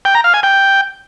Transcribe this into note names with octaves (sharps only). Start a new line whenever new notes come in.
G5
A#5
F5
G#5
G5